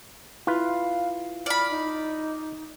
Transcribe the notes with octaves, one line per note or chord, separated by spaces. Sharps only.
E4 F4 B4 F5
D5 B5 F6
D#4